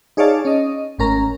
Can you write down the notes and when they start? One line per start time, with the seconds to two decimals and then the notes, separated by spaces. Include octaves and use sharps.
0.17 D#4 G#4 C#5 D5 F5 A5
0.45 C#4 D#5
0.98 G#1 A2 C#4 A#4 A#5